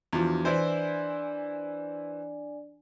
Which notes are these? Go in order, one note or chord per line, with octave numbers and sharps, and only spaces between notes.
E2 F3 D4 E4 F#4
E3 D4 E4 C5 D5 G#5